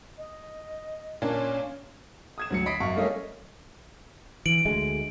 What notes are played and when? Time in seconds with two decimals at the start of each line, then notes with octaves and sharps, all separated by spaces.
0.18 D#5
1.22 A#2 A#3 C#4 D4
2.38 D#6 G#6 E7
2.50 D2 F#3 C#7
2.66 D#5 B5 B6 C7 D7
2.80 F#2 F5 C#6
2.96 G3 A3 A#3 C#4 D#5 F5
4.46 E3 D7 F#7
4.65 D2 G#3 A3